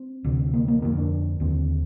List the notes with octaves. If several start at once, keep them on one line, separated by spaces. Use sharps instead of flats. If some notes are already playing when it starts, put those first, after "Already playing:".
Already playing: C4
D2 C3
A#3
A#3
F2 D3 A#3
D4
D#2 D3 C4